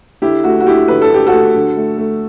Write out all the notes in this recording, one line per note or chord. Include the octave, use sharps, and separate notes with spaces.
D3 E4 G4
A3 F#4
F#4
A3 E4 G4
D3 B4
A4
D3 G4
F#4 A4
A3
D3
A3
A3